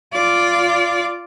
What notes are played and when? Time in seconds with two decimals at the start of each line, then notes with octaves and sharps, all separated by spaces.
0.13 F4 D5